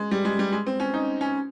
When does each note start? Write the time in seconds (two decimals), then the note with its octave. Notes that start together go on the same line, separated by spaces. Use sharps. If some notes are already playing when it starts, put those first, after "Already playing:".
Already playing: G#3
0.11 G3
0.25 G#3
0.39 G3
0.52 G#3
0.67 C4
0.80 C#4
0.94 D#4
1.21 C#4